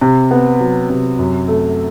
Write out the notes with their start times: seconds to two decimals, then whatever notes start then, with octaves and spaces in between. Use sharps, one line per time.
0.01 C3
0.31 B3
0.60 F#3
0.90 C3
1.19 F#2
1.48 A3